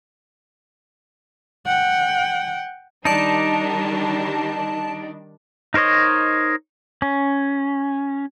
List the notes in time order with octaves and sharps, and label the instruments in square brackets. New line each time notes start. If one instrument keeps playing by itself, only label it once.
[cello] F#5 G5
[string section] D#3 G3 D4 [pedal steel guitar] D#4 D5 [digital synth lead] A5
[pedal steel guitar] D#4 A#4 C5 C#5 D#5
C#4